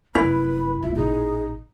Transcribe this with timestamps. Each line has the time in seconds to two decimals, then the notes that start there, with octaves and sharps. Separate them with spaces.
0.15 F1 F#2 E4 B4 B5
0.82 D1 F4 E5
0.96 A1 A#2 D#4 G#4